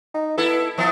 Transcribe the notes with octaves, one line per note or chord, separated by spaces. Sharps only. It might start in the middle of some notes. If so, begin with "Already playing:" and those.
D#4
B3 E4 A4
E3 F3 B3